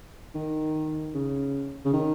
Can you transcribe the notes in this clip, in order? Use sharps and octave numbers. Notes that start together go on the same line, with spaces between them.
D#3
C#3
C#3
D#3